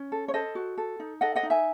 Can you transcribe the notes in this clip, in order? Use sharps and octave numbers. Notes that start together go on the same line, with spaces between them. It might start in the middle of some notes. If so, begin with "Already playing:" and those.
Already playing: C#4
A4
C#5
A4 C5 D#5
F#4
A4
D#4
A4 D#5 F#5
D#5 F#5
D#4
E5 G#5